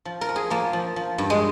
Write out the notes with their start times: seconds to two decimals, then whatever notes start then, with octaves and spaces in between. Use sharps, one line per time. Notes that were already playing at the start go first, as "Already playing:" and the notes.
0.05 F3
0.21 A#4
0.29 F3
0.36 G#4
0.50 F3 A#3
0.73 F3
0.96 F3
1.18 G2
1.30 G#3